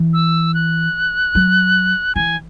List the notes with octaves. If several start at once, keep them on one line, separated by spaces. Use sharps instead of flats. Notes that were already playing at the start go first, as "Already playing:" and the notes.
Already playing: E3
E6
F#6
F#3
E3 G#5